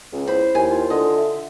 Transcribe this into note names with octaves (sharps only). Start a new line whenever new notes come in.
C#2 C#4
E4 C5 B5
D#2 G#5
F4
D3 D#5
E5